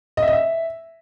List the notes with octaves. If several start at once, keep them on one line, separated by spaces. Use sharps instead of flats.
D#5
E5
D#5
E5